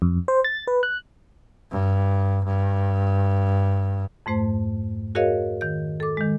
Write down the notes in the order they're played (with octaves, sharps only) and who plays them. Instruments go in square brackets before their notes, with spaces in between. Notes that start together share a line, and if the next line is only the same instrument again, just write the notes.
[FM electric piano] F2
C5
A6
B4
F#6
[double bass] G2
G2
[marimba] F2 G#2 A3 C5
F#4 G#4 A#4 C#5 D#5 F5
D#3 G6
A4 D6
D#3 G#3